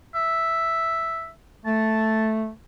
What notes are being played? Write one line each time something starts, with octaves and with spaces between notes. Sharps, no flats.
E5
A3 A5